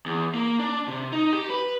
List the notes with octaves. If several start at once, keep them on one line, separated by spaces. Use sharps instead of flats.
E2
A#3
D4
C3
D#4
G4
B4